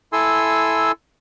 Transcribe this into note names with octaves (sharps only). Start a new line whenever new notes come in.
E4 A4 G#5 C6 E6